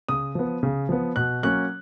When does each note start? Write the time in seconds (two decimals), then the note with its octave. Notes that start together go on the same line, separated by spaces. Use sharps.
0.09 C#3 D#6
0.35 F3 B3
0.63 C#3
0.89 F3 B3
1.16 B2 F#6
1.43 F#3 A#3 C#4 F#6